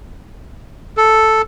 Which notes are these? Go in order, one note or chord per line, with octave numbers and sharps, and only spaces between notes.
A4